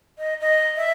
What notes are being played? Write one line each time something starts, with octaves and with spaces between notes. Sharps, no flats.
D#5
D#5
E5